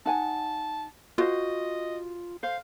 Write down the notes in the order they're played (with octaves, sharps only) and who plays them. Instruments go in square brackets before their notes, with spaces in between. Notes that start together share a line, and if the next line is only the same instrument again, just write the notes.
[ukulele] D#4 F#5 G#5 [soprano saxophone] A5
[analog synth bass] F4 [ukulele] F#4 C5 [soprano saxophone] D#5
[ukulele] C5 [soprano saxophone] F5